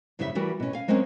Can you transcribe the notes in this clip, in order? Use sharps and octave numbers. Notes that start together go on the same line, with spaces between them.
F#2 C#3 G3 E4 G#4 E5
E3 G3 F#4 A#4
B2 C#4
F5 G#5
F#3 G#3 C4 C#4 A#4